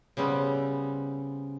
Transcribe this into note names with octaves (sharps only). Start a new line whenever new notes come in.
C#3 G3 B3 C4